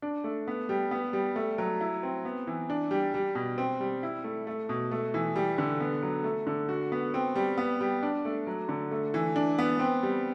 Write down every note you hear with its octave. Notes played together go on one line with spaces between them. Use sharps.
D4
A3
B3
G3
B3
G3
A3
F#3
E4
C4
B3
E3
D4
G3
G3
B2
C4
G3
E4
A3
A3
B2
A3
E3
G3
D3
B3
F#3
A3
D3
F#4
B3
C4
G3
B3
G3
D4
A3
F#3
D3
A3
E3
D4
B3
C4
G3